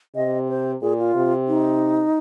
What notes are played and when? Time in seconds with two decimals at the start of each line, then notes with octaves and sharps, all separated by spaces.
0.15 C3 D#5
0.49 C5
0.82 A#2 G#4
0.98 F4
1.15 C3
1.48 D#4